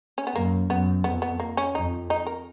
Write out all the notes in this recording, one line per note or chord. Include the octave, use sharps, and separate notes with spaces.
C#4
B3
F#2 A#3
F#2 B3
F2 B3
B3
A#3
C#4
F2 D#4
D#4
A#4